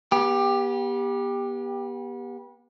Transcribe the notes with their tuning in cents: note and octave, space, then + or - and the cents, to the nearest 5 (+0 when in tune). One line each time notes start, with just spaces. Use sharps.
B3 -30 G4 +15